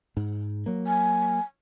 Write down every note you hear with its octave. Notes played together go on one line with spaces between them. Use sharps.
G#2
F#3 A#3
G#5